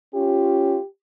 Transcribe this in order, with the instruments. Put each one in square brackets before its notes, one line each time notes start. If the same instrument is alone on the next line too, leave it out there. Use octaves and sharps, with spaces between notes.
[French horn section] C#4 F4 [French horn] G4